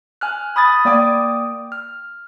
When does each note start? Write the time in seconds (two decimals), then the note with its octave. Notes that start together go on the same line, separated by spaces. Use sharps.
0.21 G#5 F6 F#6
0.56 B5 D#6 G#6 A6
0.85 A#3 D5 G5 D6 D#6
1.72 F6